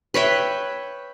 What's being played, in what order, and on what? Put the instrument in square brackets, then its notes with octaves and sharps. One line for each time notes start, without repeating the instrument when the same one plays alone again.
[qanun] B4 C#5 E5 G5